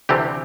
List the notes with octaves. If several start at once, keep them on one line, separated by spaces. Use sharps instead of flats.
D2 C3 E3 A3 C4 G4